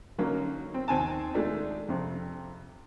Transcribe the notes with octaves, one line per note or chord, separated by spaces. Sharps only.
D3 F#3 A#3 C#4 D#4
C4
D#2 C4 G#5 A5
G#3 A3 D4 D#4
F2 C3